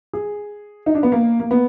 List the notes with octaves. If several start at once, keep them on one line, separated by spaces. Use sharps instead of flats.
G#4
D#4
D4
B3
A#3
A#3
B3